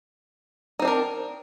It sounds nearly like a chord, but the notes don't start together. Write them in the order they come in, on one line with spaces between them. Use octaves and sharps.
D#4 C4 D4 A#4